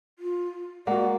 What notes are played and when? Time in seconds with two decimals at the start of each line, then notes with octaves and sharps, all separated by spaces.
0.19 F4
0.87 G#3 A#3 F#4 D5 F#5